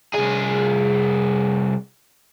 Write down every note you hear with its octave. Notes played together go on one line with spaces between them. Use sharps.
C2 G#4